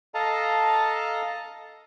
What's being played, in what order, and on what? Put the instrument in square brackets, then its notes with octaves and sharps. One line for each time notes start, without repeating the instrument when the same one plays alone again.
[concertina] A4 D#5 F5 A5 A#5